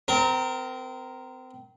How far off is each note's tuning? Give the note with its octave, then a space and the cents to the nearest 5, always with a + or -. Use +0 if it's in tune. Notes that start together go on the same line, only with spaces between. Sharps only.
C4 -30 A#4 +0 A#5 -45